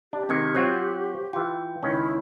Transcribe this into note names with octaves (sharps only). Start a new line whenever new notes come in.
D4 G4
C3 D#3 G#3 C4 G#6 C#7
F#3 C4 F4 F#5 C#6 F#6
E3 F4 G5
C#2 D#3 C#4 E4